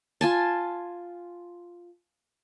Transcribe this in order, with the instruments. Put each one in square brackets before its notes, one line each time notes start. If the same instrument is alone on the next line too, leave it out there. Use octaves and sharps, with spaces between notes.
[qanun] F4 G#5 A5